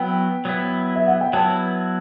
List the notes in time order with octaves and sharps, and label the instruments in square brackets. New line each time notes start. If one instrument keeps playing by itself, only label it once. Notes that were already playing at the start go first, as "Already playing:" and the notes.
Already playing: [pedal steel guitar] F#3 B3 E4 [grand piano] G5
[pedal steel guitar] F#3 B3 E4
[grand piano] E5
F#5
G5
[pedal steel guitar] F#3 B3 E4 [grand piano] A5